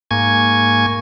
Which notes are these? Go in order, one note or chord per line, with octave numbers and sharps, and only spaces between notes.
G#2 A#3 G#5 C#6 G#6